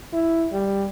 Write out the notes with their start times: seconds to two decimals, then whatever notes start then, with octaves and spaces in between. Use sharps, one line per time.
0.13 E4
0.53 G3